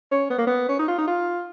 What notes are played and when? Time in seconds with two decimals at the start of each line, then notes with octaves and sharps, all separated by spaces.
0.12 C#4
0.30 B3
0.38 A#3
0.47 B3
0.69 C#4
0.79 D#4
0.88 F4
0.99 D#4
1.08 F4